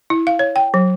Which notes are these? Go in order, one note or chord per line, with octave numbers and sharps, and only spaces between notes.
E4
F5
C#5
G5
F#3